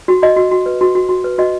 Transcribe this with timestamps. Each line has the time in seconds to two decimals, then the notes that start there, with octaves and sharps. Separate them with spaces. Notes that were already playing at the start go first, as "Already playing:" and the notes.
0.08 F#4
0.22 F#4 D#5
0.36 F#4
0.51 F#4
0.66 B4
0.81 F#4
0.95 F#4
1.09 F#4
1.24 B4
1.38 F#4 D#5